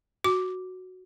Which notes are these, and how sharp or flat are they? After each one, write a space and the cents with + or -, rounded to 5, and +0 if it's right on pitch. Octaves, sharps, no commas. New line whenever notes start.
F#4 +0 D6 +0